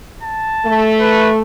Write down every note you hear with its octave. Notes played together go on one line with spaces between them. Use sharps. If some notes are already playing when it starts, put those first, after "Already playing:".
A5
A3
B4